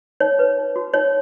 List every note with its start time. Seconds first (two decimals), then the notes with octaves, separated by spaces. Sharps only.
0.20 D#4 C#5
0.39 B4
0.58 D#4
0.76 F#4
0.94 D#4 C#5